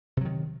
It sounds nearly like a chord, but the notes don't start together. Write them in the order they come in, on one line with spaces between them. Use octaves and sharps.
C3 F#3 D#3